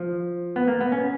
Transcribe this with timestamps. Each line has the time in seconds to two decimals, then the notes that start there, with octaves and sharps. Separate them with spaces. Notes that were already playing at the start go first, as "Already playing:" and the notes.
Already playing: F3
0.56 B3
0.68 A#3
0.81 B3
0.92 C#4